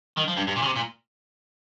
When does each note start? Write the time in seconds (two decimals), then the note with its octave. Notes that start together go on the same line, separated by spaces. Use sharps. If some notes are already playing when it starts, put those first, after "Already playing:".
0.18 D#3
0.28 F3
0.37 G2
0.47 G2
0.56 A#2
0.62 C#3
0.66 C3
0.76 A#2